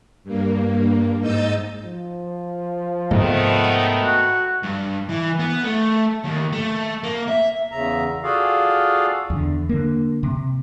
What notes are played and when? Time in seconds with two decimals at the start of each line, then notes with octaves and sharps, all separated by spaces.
0.24 G2 A#3
1.19 G#2 D#4 D#5 E6 G6 A6
1.84 F3
3.11 G#2 C3 D#3 G#3 A3 B3
4.02 F#4
4.63 G2
5.09 E3
5.39 B3
5.64 A3
6.24 D#2
6.52 A3
7.03 A#3
7.28 E5
7.71 E2 C#3 E5 A#5
8.23 F4 F#4 G#4 A4 D5 F5
9.30 E2 D3
9.69 D3 A#3
10.23 C3